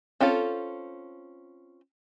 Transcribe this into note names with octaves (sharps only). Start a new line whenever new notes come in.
C4 C#4 F4 A4